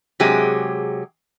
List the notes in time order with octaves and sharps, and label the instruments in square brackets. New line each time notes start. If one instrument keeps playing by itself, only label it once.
[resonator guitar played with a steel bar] C3 F#3 G#3 G4 G#4